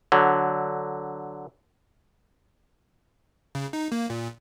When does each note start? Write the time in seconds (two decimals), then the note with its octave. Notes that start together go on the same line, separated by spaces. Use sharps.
0.12 D3 F#3
3.55 C#3
3.73 D#4
3.92 A#3
4.10 A#2